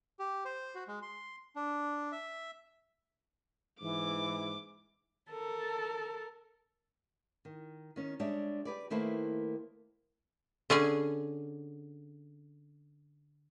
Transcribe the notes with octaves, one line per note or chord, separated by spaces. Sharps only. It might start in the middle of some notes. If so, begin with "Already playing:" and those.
G4
C5
F#4
G#3
C6
D4
E5
G#2 E3 D6
A4 A#4
D#3
D#3 C#4
G3 G#3 D4 C#5 D5 E5
G4 G#4 B4 D5
D#3 A3 A#3 E4 B4 C5
D3 C#4 G#4 G#5